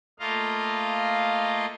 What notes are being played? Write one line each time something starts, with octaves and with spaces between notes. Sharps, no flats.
A3 A#3 F4 D#5 F5